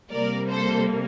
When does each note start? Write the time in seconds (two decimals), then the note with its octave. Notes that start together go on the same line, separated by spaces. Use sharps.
0.12 C3 G3 A#3 A#4 D5
0.51 A4 C5